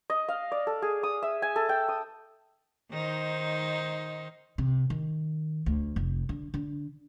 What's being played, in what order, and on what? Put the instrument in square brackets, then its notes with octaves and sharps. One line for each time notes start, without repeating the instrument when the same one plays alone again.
[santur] D#5
F5
D5
A4
G#4
D#6
E5
G#5
A4
G5
D#6
[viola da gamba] D#3 D#4 C5
[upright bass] C3
D#3
D2
F1
D3
D3